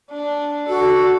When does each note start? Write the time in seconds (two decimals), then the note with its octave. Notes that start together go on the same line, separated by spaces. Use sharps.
0.11 D4
0.69 F#4 A4